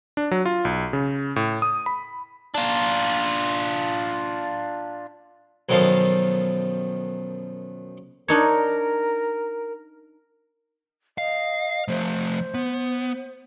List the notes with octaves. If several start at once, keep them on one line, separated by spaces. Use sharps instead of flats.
D4
F#3
F4
B1
C#3
A2
D#6
B5
D4 F4
F#2 B2 D#3 F3 A4 F5
D4 D#4 A#4 C#5
D#5 F5
F3 A3 C5
B3